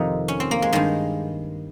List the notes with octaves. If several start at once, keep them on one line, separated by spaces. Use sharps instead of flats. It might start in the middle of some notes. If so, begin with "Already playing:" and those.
Already playing: F2 C3 D#3 D#4
C#4
C4
A#3
G#3
G2 D#3 G#3